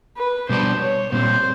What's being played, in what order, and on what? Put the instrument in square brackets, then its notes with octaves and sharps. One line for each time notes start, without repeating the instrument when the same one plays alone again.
[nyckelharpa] B4
[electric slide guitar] B2 G3 B3 D4 [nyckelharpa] C5
[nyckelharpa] C#5
[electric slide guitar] A#2 G3 C4 [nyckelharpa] C5